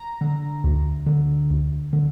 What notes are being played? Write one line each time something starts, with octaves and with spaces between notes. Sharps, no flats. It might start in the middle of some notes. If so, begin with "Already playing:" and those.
Already playing: A#5
D3
D2
D3
D2
D3